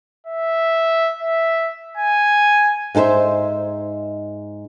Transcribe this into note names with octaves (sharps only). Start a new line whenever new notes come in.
E5
E5
G#5
G#2 D#4 A4 C5 E5